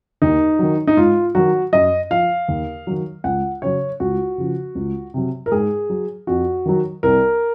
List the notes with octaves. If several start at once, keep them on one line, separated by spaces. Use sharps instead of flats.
D#2 D#4
D#3 F#3
D#4
G#2 F4
D#3 F#3 F#4
F#2 D#5
F3 F5
D#2
D#3 F#3
C#2 F#5
C#3 F#3 C#5
C#2 F#4
C#3 F3
C#2
C3 F#3
A#4
G#2 G#4
F#3
F2 F#4
D#3 F#3
C2 A#4